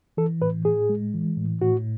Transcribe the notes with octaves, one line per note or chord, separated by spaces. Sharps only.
E3 A4
A2 B4
A2 G#4
G#3
E3
A2
A2 F#4